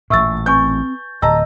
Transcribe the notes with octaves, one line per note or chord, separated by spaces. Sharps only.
A1 A#2 E5 C#6 E6 A6
C4 B4 G#5 C#6 G6
D1 D#5 A5 A#5 E6